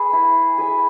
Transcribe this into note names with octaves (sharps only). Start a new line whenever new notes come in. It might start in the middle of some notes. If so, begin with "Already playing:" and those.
Already playing: G#4 B4
E4
G#4 B4 E5